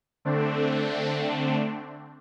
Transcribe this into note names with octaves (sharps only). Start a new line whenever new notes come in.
D3 A3 C4 D4